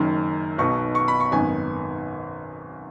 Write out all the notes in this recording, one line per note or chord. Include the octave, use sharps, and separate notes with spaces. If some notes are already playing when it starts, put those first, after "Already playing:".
Already playing: F#1 F#2 D#3
B1 B2 B3 D#4 C#6
C#6
B5
C#6
G#1 F#2 D#3 B3 G#5